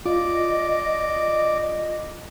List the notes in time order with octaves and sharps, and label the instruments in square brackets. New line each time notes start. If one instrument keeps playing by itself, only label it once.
[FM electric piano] F4 [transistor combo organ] D5 D6 [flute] D#5